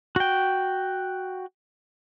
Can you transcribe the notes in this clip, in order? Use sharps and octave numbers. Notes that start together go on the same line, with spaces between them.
F#4 G5